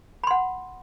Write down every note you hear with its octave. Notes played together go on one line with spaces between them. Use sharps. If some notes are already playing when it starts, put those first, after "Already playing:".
F#5 B5 C6